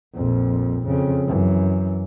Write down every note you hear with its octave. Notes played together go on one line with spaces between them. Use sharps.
A#1 F2
F2 C#3
F#2 E3